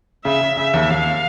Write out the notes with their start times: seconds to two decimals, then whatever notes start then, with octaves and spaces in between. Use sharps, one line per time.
0.25 C#3 E5
0.41 C#3
0.57 C#3 E5
0.74 D#2
0.90 D#2 F5